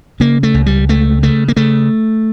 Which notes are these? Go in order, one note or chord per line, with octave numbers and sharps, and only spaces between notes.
C#3 A#3
A3
C#2
G3
C#2 A3
C#3 A3
A#3
C#3 A3